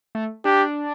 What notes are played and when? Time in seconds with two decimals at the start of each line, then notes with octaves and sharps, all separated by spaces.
0.15 A3
0.45 D4 G4